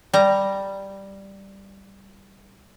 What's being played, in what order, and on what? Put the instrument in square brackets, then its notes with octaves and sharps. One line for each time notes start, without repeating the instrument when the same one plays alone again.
[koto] G3 A#5